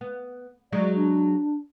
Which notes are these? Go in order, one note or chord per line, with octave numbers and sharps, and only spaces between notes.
B3
F#3 G#3 D#4 D5
D4